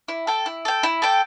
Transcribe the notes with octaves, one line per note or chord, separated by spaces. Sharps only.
E4
A4 G5
E4
A4 G5
E4
A4 G5